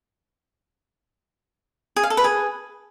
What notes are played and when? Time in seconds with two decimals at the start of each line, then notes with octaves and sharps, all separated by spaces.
1.96 G#4
2.03 F5
2.10 A4
2.17 B4
2.24 G#4